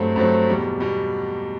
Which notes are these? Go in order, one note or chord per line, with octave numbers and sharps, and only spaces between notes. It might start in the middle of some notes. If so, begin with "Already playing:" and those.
Already playing: G2 F#3 A3 C4
G2 F#3 A3 C4
E2 B2 G3
B2 G3